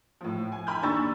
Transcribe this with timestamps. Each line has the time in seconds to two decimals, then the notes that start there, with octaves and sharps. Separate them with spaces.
0.21 A2 F3
0.52 G#5
0.67 G5 G#5 A#5 B5 F6 G6
0.82 D#2 D4 A#5 C#6 E6 A6